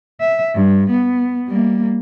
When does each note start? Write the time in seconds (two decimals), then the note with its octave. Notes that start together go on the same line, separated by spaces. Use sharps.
0.21 E5
0.55 G2
0.90 B3
1.48 G3 A#3